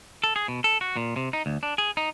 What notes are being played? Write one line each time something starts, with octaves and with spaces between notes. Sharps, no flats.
A4
G#4
B2
A4
F#4
A#2
C3
D#4
D2
D4
G#4
D#4